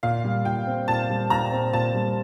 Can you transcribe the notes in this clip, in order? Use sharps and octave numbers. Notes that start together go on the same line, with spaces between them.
A#2 F5
G3
A#2 G5
C4
A#2 A5
G3
A#2 A#5
C4
A#2 A5
G3